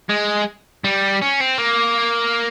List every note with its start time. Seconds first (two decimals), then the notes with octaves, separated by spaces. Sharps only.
0.10 G#3
0.84 G3
1.22 C#4
1.40 C4
1.58 A#3